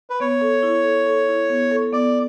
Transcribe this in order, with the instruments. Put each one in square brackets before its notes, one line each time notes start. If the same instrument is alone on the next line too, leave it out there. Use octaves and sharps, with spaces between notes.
[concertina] B4
[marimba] B3 [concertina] C#5
[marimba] A4
E4
A4
A4
E4
B3
A4
[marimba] B3 [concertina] D5